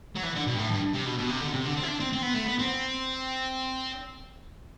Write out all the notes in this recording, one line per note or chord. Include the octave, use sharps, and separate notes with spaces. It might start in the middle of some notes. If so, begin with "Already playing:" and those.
F#3
E3
D3
B2
G2
A2
G2
C3
B2
B2
C3
D3
C3
D3
C4
E4
D4
C4
C4
B3
A3
B3
C4